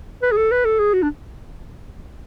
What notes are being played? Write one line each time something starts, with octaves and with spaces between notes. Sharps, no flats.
B4
G#4
A4
B4
A4
G#4
F#4
D4